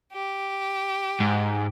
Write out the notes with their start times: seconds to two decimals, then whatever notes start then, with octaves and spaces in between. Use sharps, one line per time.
0.12 G4
1.20 G#2